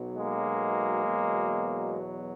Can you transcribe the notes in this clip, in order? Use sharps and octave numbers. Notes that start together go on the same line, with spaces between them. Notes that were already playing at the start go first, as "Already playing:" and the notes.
Already playing: B1 B2 F#3
G#3 A#3
E2 B2 F#3